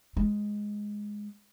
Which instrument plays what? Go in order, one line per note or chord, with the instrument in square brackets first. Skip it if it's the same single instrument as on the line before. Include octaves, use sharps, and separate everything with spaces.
[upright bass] G#3